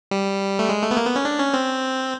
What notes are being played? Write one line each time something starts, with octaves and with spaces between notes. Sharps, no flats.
G3
A3
G#3
A3
B3
A#3
B3
C#4
D4
C#4
C4